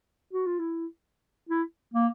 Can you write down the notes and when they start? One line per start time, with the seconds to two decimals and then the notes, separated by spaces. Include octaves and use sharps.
0.33 F#4
0.46 F4
0.59 E4
1.49 E4
1.94 A#3